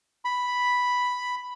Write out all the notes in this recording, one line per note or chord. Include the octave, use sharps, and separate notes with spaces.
B5